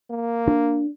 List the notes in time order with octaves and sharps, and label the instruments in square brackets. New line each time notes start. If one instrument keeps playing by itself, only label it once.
[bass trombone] A#3
[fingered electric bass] D4